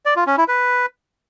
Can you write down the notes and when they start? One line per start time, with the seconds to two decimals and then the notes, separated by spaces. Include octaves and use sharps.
0.06 D5
0.16 F4
0.27 C#4
0.38 E4
0.48 B4